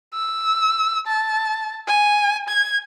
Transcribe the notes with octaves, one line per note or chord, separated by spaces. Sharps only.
E6
A5
G#5
G#6